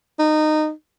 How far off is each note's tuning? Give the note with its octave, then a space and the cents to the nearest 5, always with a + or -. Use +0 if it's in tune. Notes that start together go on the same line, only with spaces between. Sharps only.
D#4 -20